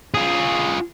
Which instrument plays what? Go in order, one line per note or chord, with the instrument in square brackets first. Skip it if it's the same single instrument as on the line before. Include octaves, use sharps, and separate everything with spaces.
[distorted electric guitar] F4 G#4